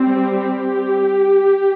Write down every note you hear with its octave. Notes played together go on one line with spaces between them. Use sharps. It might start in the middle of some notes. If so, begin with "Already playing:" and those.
Already playing: G3 C4
G4